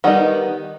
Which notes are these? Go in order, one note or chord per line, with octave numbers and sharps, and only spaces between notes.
D#3 G3 B3 D#4 F#5